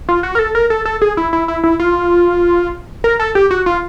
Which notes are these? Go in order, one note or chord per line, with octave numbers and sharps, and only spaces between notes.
F4
F#4
A#4
A4
A#4
A4
A4
G#4
E4
E4
E4
E4
F4
A#4
A4
G4
F#4
F4